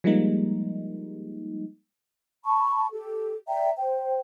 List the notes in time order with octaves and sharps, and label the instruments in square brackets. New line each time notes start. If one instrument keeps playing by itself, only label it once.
[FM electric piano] F3 G3 G#3 A#3 D#4
[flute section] A5 B5 C#6
G4 A4
D5 E5 G5 A#5
C5 G5